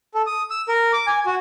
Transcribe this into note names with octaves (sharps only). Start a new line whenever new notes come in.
A4
D#6
E6
A#4
D6
G#5
F#4